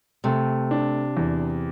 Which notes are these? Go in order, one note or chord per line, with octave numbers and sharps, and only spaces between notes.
C3 A3
D4
E2